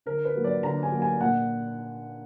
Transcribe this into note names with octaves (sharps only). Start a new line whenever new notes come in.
D3 A#4
B4
F#3 A#3
D5
D3 A#5
G#5
F#3 A#3
G#5
A#2 F#5